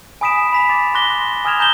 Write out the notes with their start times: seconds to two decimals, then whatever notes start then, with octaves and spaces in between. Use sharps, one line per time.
0.21 G#5 B5 D#6 B6 D7 E7
0.52 B5 B6 F7
0.69 D6 A6
0.94 C6 D6 F#6 A#6 G7
1.45 G#5 D#6 F6 G#6 E7 F7
1.60 A#5 G6 A#6 E7 G7